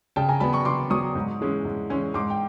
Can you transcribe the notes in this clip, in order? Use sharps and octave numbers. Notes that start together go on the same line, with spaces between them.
C#3 G5 A5
G#5 A#5
F#3 B3 A5 B5
B5 C#6
C#3 C6 D6
F#3 B3 C#6 D#6
G#2
E3 G#3 C#4 E4
G#2
E3 G#3 C#4 E4
G#2 C6 D6
G5